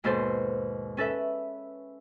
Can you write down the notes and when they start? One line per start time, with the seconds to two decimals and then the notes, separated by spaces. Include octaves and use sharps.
0.04 D#2 G#2 B2 A4 C5
0.97 C#4 A4 B4 E5